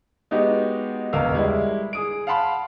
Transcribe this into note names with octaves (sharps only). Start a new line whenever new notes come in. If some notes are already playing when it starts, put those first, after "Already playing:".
G#3 B3 D#4 F#4 G4
E1 C#2 B2 A#4 F5 E6
G3 G#3 E4
G#4 D#6 D7
F5 F#5 A5 B5 C6